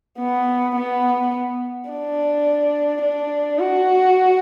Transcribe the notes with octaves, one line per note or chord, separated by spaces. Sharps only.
B3
B3
D4
D4
F#4